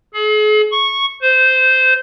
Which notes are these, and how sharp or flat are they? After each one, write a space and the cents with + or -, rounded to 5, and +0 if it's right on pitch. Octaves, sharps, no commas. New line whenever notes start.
G#4 +45
C#6 -10
C5 -15